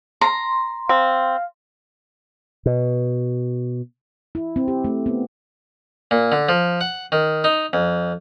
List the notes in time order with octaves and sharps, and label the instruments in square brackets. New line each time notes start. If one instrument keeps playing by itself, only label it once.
[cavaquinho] A#5 [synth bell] C6
[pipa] C4 [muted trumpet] F5
[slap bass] B2
[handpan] E4
C4
G4
A3
B3
[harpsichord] A#2
D3
F3
F#5
D#3
D#4
F2